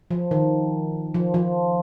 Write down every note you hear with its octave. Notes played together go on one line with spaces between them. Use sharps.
F3
D#3
F3
F3